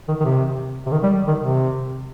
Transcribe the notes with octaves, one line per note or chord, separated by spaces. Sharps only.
D#3
D#3
C3
C3
D#3
G3
D#3
C3